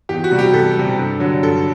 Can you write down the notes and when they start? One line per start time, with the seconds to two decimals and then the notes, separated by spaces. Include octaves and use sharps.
0.09 E2 G4
0.24 F#4
0.31 C3 G3
0.39 G4
0.53 E2 A4
0.75 C3 G3
0.98 G2
1.20 D3 F#3
1.43 G2 A4